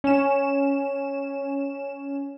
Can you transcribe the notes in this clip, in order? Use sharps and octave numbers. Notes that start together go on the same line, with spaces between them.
C#4 E7